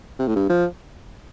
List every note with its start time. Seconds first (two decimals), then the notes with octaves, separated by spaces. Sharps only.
0.19 C3
0.28 A2
0.36 G2
0.50 F3